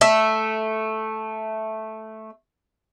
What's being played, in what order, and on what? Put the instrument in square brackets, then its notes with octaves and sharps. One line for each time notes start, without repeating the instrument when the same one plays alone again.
[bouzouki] A3 E5